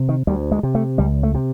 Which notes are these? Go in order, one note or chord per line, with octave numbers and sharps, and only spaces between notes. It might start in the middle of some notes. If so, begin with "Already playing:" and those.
Already playing: C3
D#3
D2 G3
G#3
C3
A3
C#2 G3
A3
C3